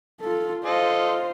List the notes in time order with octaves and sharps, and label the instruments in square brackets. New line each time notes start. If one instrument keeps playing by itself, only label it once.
[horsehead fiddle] F4 A4
[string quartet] F4 [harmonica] A4 D#5 [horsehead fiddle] C5